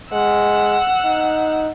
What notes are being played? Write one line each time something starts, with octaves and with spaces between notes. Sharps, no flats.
G#3 F#5 E6
D#4